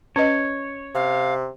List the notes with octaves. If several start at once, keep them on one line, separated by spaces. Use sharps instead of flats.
C#4 B4 C#5 D#5
C3 F5